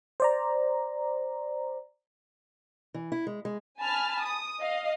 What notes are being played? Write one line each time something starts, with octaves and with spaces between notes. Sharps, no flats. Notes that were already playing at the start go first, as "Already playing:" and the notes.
C5 D5 A#5
E3
E4
G#3
G#3
G#5 A5 B5 F6
D#6
D#5 F5